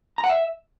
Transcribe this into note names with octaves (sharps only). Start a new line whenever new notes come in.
A#5
F#5
E5